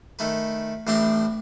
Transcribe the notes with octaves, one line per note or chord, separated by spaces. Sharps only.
D#3 A3 B4
A1 A2 C4 D4 A#5 C6